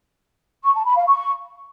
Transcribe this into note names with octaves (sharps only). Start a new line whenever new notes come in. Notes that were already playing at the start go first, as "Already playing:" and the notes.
C#6
A5
B5
F5
C#6